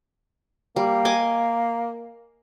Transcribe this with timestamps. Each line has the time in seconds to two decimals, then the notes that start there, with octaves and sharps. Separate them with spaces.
0.76 G3 A#3
1.05 D#5 G#5 D6